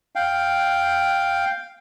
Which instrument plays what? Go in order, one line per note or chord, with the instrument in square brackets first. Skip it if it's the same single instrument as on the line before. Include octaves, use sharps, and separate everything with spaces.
[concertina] F5 G5